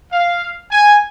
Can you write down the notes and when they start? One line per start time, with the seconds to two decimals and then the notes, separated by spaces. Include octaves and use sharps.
0.13 F5
0.72 G#5